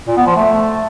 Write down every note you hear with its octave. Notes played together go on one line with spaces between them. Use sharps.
A#2
B3
F3
A3